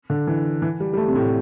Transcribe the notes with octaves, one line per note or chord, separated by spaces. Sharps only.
D3
E3
E3
G3
G3
A3
C3
A2